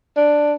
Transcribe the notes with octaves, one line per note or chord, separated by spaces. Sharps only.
D4